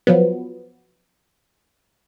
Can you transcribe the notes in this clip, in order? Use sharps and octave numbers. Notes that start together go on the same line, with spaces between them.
F3 F#3 B3